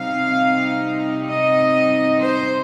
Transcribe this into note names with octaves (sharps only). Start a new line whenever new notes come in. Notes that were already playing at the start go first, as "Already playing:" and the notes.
Already playing: C3 G3 C4 D#4 F5
D#5
C5